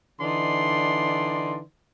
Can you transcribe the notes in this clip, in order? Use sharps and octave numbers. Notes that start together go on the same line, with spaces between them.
D3 E3 D#4 D5 C6